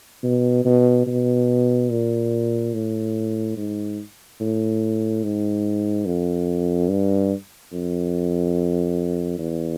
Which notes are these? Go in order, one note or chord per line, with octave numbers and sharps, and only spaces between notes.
B2
B2
B2
A#2
A2
G#2
A2
G#2
F2
G2
F2
E2